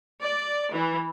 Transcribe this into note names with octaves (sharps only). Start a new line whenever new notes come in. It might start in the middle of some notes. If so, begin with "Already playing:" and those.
D5
E3